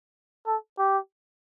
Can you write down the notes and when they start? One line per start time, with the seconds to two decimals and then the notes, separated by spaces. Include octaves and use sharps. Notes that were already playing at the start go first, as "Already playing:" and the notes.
0.47 A4
0.79 G4